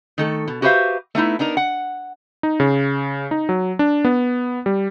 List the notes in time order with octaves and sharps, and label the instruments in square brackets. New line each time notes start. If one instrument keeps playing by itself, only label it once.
[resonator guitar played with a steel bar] D#3 A3 A4
B2
F#4 G4 B4 C5 E5 F5
A3 B3 D#4 E4
B3 D4 D#4 A#4
F#5
[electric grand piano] D#4
C#3
D#4
F#3
D4
B3
G3